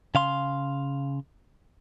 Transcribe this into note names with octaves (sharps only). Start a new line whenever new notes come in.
C#3 F5 C6